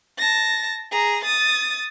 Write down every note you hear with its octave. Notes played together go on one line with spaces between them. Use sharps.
A5 A#6
G#4 A#5
D#6 A6